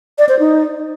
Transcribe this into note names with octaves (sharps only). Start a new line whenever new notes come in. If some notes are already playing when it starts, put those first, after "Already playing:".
D5
C5
D#4